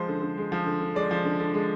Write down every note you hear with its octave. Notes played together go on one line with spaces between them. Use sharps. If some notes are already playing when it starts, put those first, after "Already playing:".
Already playing: F3 G#3 C5
D3
D3
G#3
F3
D3
D3
G#3 D5
F3
D3
D3
G#3